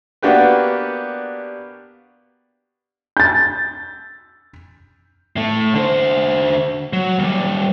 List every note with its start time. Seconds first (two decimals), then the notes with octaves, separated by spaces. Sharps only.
0.22 A#3 B3 D4 F#4 G4 B4
3.17 G6 A6
5.36 A2 A3
5.75 D3 C5
6.93 F#3
7.19 D#2 G3